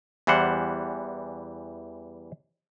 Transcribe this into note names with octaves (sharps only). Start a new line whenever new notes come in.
E2 E3 G3 C5 F#5